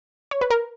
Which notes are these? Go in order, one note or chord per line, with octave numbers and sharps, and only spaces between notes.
C#5
B4
A#4